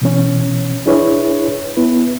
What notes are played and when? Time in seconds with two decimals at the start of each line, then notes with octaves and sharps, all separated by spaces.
0.02 B2 E3 C#4
0.86 D4 E4 G#4 B4 C#5
1.77 B3 E4 B4